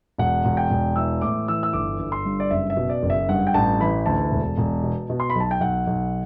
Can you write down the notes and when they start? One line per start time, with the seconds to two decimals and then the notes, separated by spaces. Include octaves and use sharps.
0.18 E1 F#5
0.45 E1
0.57 G5
0.70 E1
0.96 E3 E6
1.21 A2 D6
1.48 E3 E6
1.63 E6
1.73 G1 D6
2.00 G1
2.12 C6
2.25 G2
2.40 D5
2.51 F#1 E5
2.70 E5
2.77 B2
2.89 D5
3.03 F#1
3.10 E5
3.28 G2 F#5
3.47 G5
3.54 A1 A5
3.80 E3 B5
4.06 D2 A5
4.31 E1
4.58 E1
4.83 B2
5.10 B2
5.20 C6
5.30 B5
5.35 B1 A5
5.51 G5
5.60 B1 F#5
5.87 B1